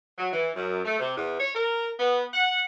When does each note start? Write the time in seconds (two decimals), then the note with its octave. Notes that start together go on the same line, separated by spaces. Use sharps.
0.18 F#3
0.33 E3
0.55 F#2
0.85 A3
0.99 C3
1.16 E2
1.39 C#5
1.55 A#4
1.99 B3
2.33 F#5